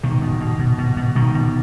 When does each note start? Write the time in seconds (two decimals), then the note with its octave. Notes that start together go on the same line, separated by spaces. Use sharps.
0.03 B2 D#3
0.22 B2
0.41 B2
0.59 B2
0.78 B2
0.97 B2
1.15 B2 D#3
1.35 B2